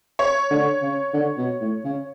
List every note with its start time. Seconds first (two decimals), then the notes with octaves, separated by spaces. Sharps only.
0.19 C#5
0.51 D3
0.82 C#3
1.14 D3
1.37 B2
1.61 A2
1.84 C#3